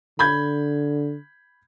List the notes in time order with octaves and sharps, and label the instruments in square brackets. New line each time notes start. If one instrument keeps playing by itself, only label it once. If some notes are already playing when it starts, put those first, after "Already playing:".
[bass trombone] D3 [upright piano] B5 G6 G#6